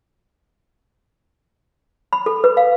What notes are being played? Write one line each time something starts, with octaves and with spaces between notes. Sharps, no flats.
B5
A4
B4
F5